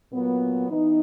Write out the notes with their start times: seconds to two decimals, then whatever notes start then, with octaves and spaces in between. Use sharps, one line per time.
0.11 A#2 F#3 B3
0.70 E3 B3 D#4